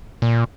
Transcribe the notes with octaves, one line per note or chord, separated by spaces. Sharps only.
A#2